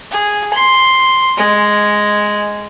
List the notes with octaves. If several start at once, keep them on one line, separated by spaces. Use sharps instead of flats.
G#4
C6
G#3